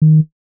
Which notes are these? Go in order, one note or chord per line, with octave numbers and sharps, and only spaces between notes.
D#3